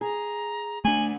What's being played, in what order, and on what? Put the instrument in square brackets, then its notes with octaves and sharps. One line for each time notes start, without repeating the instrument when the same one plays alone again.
[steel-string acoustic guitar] G#4 [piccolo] A#5
[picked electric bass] A3 D4 [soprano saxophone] G#5 [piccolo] F#7